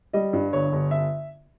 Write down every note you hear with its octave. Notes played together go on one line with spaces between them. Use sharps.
G3 D#5
G2
G1 C#5
G1
E5